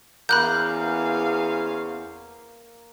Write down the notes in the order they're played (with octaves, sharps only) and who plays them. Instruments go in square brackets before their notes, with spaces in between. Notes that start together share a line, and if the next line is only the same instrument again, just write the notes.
[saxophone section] E2 [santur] A#3 [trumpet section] C#4 C5 F5 [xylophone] B5 F#6 G6